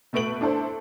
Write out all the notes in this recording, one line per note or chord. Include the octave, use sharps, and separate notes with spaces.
B2 A3 B4 D7 F#7
D4 E4 A4 C5